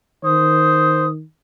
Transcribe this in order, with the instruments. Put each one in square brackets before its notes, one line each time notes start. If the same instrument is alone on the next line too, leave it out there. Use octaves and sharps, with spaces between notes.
[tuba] D#3 [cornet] C5 [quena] D#6